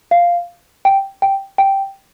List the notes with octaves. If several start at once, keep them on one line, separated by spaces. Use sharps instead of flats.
F5
G5
G5
G5